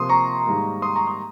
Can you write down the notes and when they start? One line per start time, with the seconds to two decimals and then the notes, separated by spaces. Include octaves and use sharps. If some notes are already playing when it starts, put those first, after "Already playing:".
Already playing: C3 F3 A#3 C6 D#6
0.09 A#5 C#6
0.47 G#2 D#3 G3 A#3
0.82 C6 D#6
0.96 A#5 C#6
1.07 C6 D#6